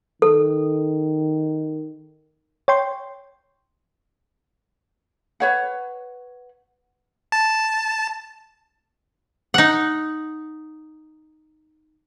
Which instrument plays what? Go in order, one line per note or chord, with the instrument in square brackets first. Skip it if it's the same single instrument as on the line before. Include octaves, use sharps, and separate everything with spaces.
[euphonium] D#3 [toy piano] A4
[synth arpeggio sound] C#5 G5 C6
[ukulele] B4 C#5 F#5
[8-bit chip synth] A5
[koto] D#4 F#5